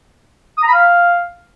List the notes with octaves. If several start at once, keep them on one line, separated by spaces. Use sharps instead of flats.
D#6
A#5
B5
F5